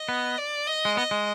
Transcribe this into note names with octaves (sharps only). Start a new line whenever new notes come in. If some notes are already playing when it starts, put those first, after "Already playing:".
Already playing: D#5
B3
D5
D#5
G#3
B3 D#5
G#3